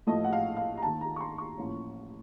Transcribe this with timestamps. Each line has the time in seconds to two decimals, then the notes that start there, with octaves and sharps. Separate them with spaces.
0.07 A1 A2 F3 A3 D#5
0.24 F#5
0.33 F5
0.57 F5
0.77 A#5
0.82 D#2 D#3 A#3 A5
1.01 A#5
1.16 C#6
1.21 C6
1.38 C#6
1.58 A1 A2 F3 A#3 C#4